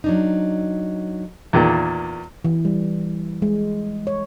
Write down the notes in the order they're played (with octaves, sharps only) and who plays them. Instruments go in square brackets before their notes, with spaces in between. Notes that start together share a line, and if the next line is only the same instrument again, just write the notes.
[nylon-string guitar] F#3 D4 D#4
[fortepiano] E2 A#2 D#3
[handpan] E3
G3
G#3
C#5